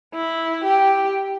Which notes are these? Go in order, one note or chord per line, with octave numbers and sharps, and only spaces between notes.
E4
G4